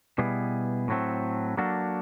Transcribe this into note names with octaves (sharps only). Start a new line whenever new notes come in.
B2 G3 B3 E4 G#4
A2 F#3 A3 C4
F#3 A#3 D4 F#4 A4